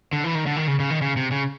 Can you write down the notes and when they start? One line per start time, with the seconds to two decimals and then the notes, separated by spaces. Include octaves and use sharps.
0.13 D3
0.24 E3
0.35 D#3
0.46 D3
0.56 D#3
0.68 C#3
0.80 C#3
0.90 D#3
1.02 C#3
1.17 C3
1.31 C#3